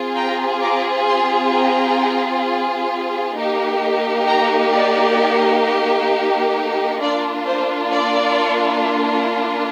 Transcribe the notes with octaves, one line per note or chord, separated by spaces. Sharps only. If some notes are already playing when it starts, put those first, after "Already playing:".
Already playing: C4 F4 G#4
G5 A#5
A#5 D6
G#5 C6
G5 A#5
A#3 D#4 G4
G5 A#5
D5
A#3 D4 F4 D5
C5
D5